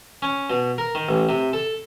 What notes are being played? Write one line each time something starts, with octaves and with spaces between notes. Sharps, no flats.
C#4
B2
A#4
D#3
A1
C3
A4